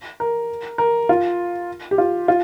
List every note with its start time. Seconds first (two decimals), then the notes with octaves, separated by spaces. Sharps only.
0.20 A#4
0.78 A#4
1.09 F4
1.91 G4
1.98 F4
2.28 F4